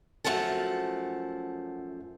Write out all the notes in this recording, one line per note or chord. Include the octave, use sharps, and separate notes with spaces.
F#2 F3 A3 F#5 A5